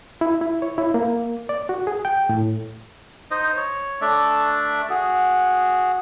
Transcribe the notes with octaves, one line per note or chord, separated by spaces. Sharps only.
E4
E4
C#5
E4
A#3
D5
F#4
G#4
G5
A2
D#4 C5 D#5
C#5
A3 D4 D5 E5
F#4 G#4